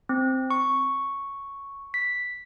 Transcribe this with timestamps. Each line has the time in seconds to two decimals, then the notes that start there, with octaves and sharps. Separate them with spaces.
0.09 C4
0.51 C#6
1.94 B6